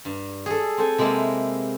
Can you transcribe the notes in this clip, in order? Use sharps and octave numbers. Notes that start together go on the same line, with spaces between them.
G2
G#4 A4
C4 A4 G#5
C3 G#3 A#3 E4 A#4 A5